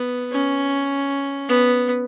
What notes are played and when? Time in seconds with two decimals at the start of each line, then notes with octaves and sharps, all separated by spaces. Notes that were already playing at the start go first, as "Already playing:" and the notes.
Already playing: B3
0.32 C#4
1.48 B3